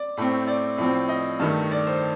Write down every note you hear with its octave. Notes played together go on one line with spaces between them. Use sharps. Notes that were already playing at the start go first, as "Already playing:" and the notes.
Already playing: D5
A2 A3 C4
D5
A2 F3 C4
D#5
G2 D#3 A3
D5
C5